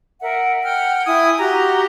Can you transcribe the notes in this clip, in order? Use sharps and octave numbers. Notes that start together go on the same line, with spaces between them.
A#4 E5 F#5
F#5 G5 F6
E4 G#5 D#6 G#6
F#4 G4 A#5